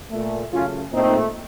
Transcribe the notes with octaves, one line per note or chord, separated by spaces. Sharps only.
A#2 A3
F#2 C#3 A3 C#4 F4
A#2 A3 C4 D#4